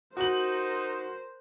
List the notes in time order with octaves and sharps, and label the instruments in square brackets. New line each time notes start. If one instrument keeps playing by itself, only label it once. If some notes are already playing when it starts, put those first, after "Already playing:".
[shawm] D#4 [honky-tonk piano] F#4 F#7 [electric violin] A#4 C5